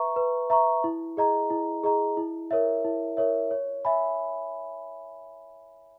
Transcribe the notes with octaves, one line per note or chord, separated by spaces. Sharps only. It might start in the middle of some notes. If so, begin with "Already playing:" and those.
Already playing: B4 E5 A#5 C#6
B4
E5 A#5 C#6
E4
G#4 D#5 A#5
E4
G#4 D#5 A#5
E4
A#4 C#5 E5
E4
A#4 C#5 E5
C#5
E5 G#5 B5